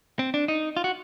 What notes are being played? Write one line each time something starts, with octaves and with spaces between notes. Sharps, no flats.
C4
D4
D#4
F4
F#4